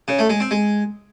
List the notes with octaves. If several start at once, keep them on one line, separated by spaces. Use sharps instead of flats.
C#3
A3
G#3
C4
G#3